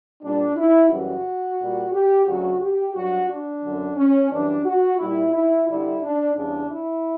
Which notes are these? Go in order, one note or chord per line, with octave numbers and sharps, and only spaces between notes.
A#2 G3 D4
E4
F#2 C#3 E3 G3 F#4
A#2 G3
G4
D2 C#3 F#3 F#4
G4
G2 F#3 F#4
D4
F#2 D3 F#3
C#4
F#2 E3 G3 D4
F#4
A#2 G3 E4
E4
G2 D3 G3 E4
D4
E2 C#3 G3 D4
E4